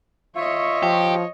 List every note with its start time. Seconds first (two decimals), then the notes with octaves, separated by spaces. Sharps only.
0.36 F4 C#5 D#5 E5 C#6
0.83 F3 G4